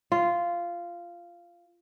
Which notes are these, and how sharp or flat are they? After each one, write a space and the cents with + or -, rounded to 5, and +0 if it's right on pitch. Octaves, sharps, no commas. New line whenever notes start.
F4 -10